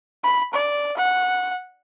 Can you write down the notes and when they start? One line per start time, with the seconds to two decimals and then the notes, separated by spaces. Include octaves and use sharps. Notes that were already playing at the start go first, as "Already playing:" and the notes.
0.24 B5
0.53 D5
0.97 F#5